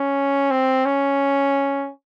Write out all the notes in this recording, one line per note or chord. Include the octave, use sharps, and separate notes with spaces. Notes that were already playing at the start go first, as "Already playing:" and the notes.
Already playing: C#4
C4
C#4